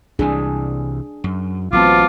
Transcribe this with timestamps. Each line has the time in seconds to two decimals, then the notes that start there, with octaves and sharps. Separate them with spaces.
0.19 C2 C3 E3 D4 G#4
1.24 F#2
1.73 A1 F#3 B3 C4 F4 A5 D6